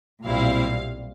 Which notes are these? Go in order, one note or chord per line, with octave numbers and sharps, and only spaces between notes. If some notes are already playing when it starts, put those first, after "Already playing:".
B1 A#2 G3 C4 E4 F5